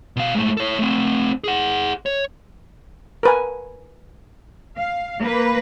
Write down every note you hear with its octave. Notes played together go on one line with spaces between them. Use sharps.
B2 F5
G#2 A3
A4 C#5
A3 C4
G#4 F#5
C#5
A#4 B4 G#5
F5
A#3 B4